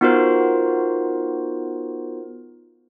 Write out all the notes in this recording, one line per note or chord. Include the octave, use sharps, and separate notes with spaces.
B3 D#4 F4 F#4 A#4 C5